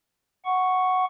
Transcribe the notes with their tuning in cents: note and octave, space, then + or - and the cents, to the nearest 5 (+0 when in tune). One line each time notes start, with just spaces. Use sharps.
F#5 +0 C#6 +0